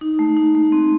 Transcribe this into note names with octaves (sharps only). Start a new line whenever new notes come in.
D#4
A3
D#4
A3
C4